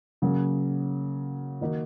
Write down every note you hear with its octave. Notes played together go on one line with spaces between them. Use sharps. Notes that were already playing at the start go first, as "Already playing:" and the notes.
C#3 F#3 A#3
D#3 A#3 D#4 F#4